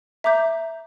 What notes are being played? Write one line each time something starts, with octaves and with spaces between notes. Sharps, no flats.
E5 A#5 D6 G6